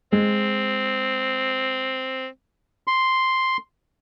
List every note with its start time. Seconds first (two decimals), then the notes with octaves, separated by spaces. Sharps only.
0.12 G#3 C4
2.87 C6